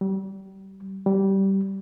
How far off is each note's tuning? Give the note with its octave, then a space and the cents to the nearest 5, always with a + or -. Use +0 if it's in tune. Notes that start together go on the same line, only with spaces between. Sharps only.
G3 -30
G3 -15